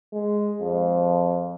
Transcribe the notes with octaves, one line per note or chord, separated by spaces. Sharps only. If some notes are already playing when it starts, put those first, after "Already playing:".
G#3
F2